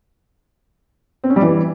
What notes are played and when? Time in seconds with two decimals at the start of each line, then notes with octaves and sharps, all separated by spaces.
1.24 C4
1.30 C#4
1.36 G3
1.42 E3